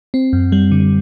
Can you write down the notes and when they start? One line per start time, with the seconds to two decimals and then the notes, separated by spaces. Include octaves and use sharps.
0.14 C4
0.33 F#2
0.52 G3
0.71 D3